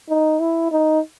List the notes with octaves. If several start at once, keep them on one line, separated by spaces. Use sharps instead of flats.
D#4
E4
D#4